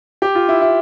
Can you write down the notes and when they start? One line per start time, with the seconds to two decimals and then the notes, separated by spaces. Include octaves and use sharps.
0.22 G4
0.35 F4
0.48 E4
0.61 E4